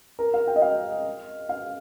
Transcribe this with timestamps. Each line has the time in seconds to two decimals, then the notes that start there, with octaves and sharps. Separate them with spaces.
0.19 A#4
0.34 F5
0.47 G5
0.56 D#5
0.62 F5
1.49 F5